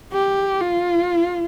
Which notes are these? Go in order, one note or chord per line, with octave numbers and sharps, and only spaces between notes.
G4
F4